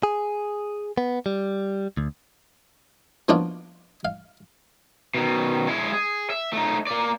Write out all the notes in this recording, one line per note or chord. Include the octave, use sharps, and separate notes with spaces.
G#4
B3
G3
D2
F3 A#3 B3 C#4 D4 F4
F5
B2 D#3
G#3 E4
G#4
E5
A3 D#4
A#3 D5